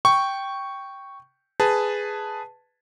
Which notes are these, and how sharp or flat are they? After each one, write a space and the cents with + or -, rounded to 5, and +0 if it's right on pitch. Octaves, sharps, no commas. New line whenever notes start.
G5 -5 C#6 +0
G#4 +0 B4 +10 A5 +0